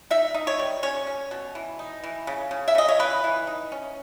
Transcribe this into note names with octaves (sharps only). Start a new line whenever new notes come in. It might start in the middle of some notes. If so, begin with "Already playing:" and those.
D#4 E5
D#4
C#5
G3
C#4 C#5
C#4
B2
E3
D#4
E3
C#3
C#3
E5
C#3 D#5
C#5
E3 B4
E3
D#4
C#4